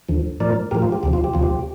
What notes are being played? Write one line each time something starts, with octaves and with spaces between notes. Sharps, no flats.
D#2 D3 F3
A2 F3 A#4 D5
A2 F3 G4 A#4
F4
G4
D2 C3 F3 G4
F4
G4
D2 C3 F3 F4
G4